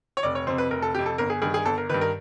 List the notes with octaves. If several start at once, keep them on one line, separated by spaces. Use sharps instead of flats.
C#5
F1 D5
C#5
F2 C3 C5
B4
F1 A#4
A4
F2 C3 G4
A4
G1 A#4
G#4
G2 D#3 G#4
G#4
G1 A4
A#4
G2 D#3 B4
A#4